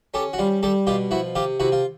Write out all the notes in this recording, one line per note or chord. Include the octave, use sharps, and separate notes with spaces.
C#4 G4 A4
F#4
G3 F4
G3 G4 A4
B2 F4 G4
F3 E4 F#4
C3 F4 G4
C3 E4 F#4
F4